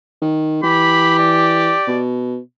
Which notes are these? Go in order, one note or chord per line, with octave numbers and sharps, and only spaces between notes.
D#3
E3 G4 B5
D5
B2